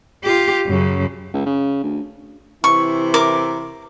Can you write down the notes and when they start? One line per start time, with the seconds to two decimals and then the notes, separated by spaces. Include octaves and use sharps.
0.23 F4 G4
0.66 F#2 C#3
1.34 C#2
1.46 C#3
1.83 D2
2.64 C3 E3 E4 C#6
3.14 A#4 D6